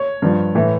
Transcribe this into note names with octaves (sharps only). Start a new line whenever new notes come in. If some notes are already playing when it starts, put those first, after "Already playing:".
Already playing: C#5
G2 F3
A2 E3